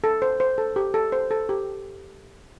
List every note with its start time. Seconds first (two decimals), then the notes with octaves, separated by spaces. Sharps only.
0.04 A4
0.22 C5
0.40 C5
0.58 A4
0.76 G4
0.94 A4
1.12 C5
1.31 A4
1.49 G4